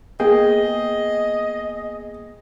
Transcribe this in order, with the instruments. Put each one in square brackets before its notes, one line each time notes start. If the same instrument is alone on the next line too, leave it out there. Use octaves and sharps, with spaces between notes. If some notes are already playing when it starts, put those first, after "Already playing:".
[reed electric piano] A#3 B3 G5 [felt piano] G#4 [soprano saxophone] D#5